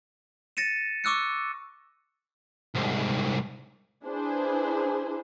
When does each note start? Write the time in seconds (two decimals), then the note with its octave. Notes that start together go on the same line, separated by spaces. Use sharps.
0.57 A6 A#6 C#7 D#7 E7
1.04 C#6 D6 E6 F#6 C#7
2.75 C2 G#2
4.04 D4 E4 G#4 B4 C5